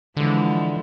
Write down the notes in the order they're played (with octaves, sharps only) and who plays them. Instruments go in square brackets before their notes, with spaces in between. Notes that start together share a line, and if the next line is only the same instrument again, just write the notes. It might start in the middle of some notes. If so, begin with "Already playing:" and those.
[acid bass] D3 [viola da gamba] E3 F3 G#3